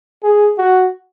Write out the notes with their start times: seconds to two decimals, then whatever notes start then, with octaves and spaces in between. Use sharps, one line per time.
0.23 G#4
0.58 F#4